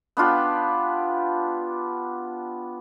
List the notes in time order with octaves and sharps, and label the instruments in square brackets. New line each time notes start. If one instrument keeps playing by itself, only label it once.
[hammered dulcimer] B3 D4 F4 G4